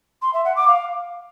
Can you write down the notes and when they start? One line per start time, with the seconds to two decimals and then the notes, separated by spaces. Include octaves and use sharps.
0.22 C6
0.33 E5
0.45 F#5
0.56 D6
0.67 F5